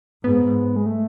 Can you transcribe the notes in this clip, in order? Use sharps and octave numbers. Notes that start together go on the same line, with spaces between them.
G#2 B3
G#3
A3